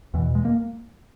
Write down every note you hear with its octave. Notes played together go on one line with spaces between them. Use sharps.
E2 B2 E3
G#3
A#3